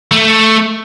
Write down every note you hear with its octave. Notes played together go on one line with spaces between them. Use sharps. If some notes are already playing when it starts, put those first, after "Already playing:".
A3